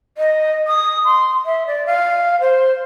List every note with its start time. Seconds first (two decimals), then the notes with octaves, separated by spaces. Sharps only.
0.18 D#5
0.67 D#6
1.05 C6
1.46 E5
1.67 D5
1.86 F5
2.41 C5